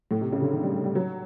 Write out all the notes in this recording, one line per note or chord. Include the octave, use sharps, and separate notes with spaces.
A2
C3
C#3
D3
D#3
G3
G3
G3
F#3